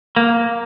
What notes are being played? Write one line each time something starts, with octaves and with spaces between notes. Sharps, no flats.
A#3